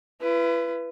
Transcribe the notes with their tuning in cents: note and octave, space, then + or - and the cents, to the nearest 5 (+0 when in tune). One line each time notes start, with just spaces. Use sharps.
E4 +40 B4 +0